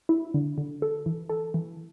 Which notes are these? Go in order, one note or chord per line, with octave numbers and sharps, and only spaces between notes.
E4
D3
D3
A4
E3
A4
E3